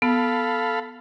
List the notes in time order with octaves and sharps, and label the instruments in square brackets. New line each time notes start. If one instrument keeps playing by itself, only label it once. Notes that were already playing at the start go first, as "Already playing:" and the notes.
[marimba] B3 [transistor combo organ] A4 F5 B5